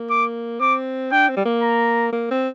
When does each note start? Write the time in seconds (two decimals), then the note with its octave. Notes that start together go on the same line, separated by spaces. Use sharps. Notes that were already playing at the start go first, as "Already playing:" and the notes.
Already playing: A#3
0.10 D6
0.60 C4 D6
1.11 D4 G5
1.29 C4
1.37 G3
1.45 A#3
1.62 A#5
2.12 A#3
2.31 C4